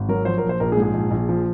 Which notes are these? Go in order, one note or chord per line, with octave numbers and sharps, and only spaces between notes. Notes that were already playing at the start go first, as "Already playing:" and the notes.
Already playing: G#1
F#3 A#4
F3 C5
A#4
A#1
C5
A#1 A#4
G#4
G#2
G#4
A#1
A#1
F3